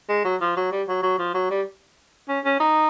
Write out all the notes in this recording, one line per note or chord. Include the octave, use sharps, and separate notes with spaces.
G#3
F#3
F3
F#3
G3
F#3
F#3
F3
F#3
G3
C#4
C#4
D#4